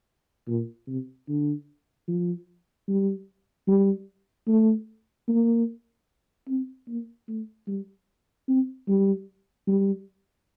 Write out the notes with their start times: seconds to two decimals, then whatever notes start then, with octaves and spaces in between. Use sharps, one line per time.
0.48 A#2
0.88 C3
1.28 D3
2.08 F3
2.88 G3
3.68 G3
4.48 A3
5.28 A#3
6.48 C4
6.88 A#3
7.28 A3
7.68 G3
8.48 C4
8.88 G3
9.68 G3